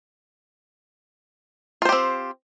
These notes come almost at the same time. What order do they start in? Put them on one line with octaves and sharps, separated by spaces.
F4 C5 G4 C4